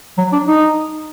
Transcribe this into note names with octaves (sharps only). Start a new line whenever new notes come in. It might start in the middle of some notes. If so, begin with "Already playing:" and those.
F#3
D4
D#4